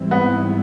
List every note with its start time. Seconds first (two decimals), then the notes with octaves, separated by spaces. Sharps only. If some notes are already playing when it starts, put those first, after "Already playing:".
Already playing: G#2 E3 G3 C4 E4
0.11 B3